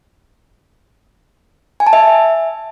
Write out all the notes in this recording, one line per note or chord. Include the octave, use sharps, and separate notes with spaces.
G#5
A5
E5